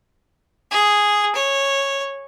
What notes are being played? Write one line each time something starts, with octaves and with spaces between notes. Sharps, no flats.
G#4
C#5